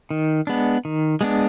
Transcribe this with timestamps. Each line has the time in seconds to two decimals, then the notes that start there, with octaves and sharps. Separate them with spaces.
0.11 D#3
0.47 G#3 B3 D4
0.85 D#3
1.21 G#3 B3 D4